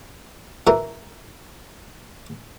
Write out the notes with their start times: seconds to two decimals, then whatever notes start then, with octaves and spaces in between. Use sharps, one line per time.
0.67 E3 A#4